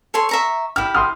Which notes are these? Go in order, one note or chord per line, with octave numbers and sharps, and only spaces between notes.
A4 C#5 C6
E5 A#5 C#6
E4 G4 F6
C6 D#6 F6